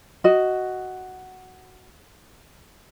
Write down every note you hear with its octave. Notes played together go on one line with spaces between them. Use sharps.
F#4 D#5